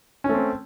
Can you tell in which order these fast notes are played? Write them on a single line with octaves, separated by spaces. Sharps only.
C#4 A3 C4